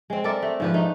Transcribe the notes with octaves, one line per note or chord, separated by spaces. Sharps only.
G#3 C4
A4 A#4 D5 E5
A3
G#2 F3 B4
A3 D#4